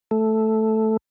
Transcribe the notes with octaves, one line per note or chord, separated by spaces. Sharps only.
A3